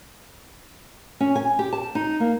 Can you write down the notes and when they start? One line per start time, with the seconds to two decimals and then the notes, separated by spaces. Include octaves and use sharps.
1.21 C#4
1.36 G#5
1.59 G4
1.73 A5
1.95 D#4
2.20 A#3